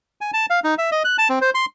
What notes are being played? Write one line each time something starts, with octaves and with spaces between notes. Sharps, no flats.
G#5
A5
F5
D#4
E5
D#5
F#6
A5
C4
C5
C6